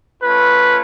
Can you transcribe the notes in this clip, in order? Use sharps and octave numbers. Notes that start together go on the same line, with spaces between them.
A3 C#4 F4 B4